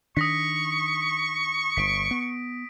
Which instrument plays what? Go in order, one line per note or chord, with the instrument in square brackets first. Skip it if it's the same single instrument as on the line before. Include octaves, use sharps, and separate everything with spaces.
[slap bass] D#3 D4 [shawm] C#6 [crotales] D#6 A#6 B6
[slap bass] G1 [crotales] B6 D7
[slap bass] B3